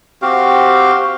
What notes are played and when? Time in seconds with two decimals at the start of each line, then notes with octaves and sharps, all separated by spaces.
0.22 C4 F#4 G4 F5